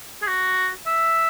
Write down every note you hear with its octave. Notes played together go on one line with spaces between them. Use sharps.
G#4
F#4
E5